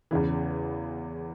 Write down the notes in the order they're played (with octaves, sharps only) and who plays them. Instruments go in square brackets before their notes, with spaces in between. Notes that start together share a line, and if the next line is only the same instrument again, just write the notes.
[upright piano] E2 C#3 E3